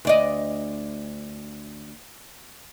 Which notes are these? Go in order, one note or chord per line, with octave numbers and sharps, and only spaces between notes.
D2 D5 D#5